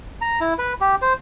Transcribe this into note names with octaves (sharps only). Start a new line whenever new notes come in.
A#5
E4
B4
G4
C5